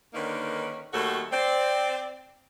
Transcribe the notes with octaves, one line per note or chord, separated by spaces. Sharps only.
D3 D#3 A#3 C#4 D#4 B4
D#2 G3 A3 F#4 A4
C4 D5